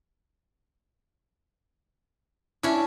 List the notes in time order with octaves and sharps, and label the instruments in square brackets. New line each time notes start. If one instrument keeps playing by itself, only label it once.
[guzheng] C#4 D4 [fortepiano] E4